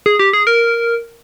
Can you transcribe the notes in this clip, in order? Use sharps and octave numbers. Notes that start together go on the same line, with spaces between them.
G#4
G4
G#4
A#4